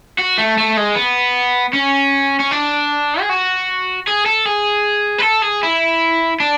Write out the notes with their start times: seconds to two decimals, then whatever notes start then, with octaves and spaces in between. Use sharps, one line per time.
0.18 F#4
0.38 A3
0.58 A3
0.77 G#3
0.96 B3
1.73 C#4
2.40 C#4
2.52 D4
3.20 G#4
3.29 F#4
4.08 G#4
4.26 A4
4.46 G#4
5.19 B4
5.23 A4
5.42 G#4
5.63 E4
6.40 D4